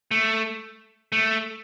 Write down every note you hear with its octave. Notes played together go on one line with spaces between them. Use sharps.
A3
A3